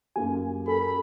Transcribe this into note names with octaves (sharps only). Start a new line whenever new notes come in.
F#2 A#3 G4 G#5
A4 A#4 B5